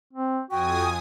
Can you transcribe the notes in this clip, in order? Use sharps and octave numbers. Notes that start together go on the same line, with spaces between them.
C4
F2 F#4 G5 G#5 D#6